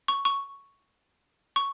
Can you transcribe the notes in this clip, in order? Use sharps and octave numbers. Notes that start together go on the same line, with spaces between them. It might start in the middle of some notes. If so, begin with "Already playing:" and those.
C#6
C#6
C#6